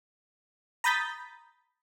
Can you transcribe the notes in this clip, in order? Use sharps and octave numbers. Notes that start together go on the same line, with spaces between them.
A#5 B5 D#6 G6 A6 B6